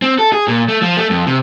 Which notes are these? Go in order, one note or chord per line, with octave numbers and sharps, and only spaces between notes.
C4
A4
G#4
A#2
A3
F3
A3
F2
C3